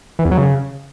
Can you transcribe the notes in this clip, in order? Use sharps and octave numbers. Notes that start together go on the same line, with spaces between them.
E3
E2
F#3
C#3